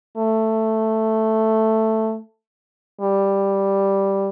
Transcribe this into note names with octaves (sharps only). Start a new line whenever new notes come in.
A3
G3